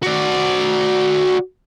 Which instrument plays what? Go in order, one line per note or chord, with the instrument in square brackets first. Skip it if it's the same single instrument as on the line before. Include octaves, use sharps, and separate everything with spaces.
[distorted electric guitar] F#4 D5